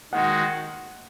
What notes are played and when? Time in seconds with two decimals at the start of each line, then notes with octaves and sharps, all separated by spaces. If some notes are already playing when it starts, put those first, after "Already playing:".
0.12 D#3 G#3 F#4 F#5